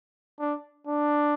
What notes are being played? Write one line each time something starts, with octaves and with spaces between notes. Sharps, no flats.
D4
D4